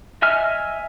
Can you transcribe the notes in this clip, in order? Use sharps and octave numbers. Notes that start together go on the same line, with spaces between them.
D#5 E5 G#5 F6